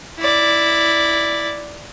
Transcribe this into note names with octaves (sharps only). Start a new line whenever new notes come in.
E4 D5